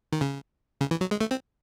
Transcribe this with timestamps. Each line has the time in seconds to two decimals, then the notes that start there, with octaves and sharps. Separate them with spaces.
0.12 D#3
0.21 C#3
0.81 C#3
0.91 E3
1.01 F#3
1.11 G#3
1.21 A3
1.31 C4